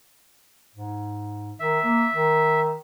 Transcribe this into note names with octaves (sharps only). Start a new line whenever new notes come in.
G#2
D#3 E5
A#3
D#3